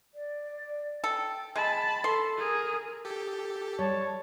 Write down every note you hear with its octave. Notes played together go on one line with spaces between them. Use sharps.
D5
A4 G5
G#3 A5 B5
A4 C6
G#4 A#4
G4 A4
G3 C#5 A5